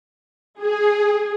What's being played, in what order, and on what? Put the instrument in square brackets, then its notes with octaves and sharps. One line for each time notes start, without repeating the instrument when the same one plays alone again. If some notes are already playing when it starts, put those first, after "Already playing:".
[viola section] G#4